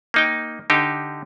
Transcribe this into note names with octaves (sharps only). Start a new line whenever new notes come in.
A#3 D#4 G5
D3 D#4 G4